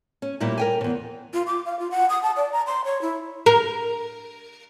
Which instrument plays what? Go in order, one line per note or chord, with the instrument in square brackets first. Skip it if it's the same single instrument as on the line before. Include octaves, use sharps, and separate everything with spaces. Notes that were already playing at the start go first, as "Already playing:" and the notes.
[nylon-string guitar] C#4
A#2 G3 A#3 E4 G4
A#4 G5 G#5
E2 C#3
[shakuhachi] F4
D6
F5
F4
F#5
D#6
A5
D5
A#5
C6
C#5
E4
[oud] A#4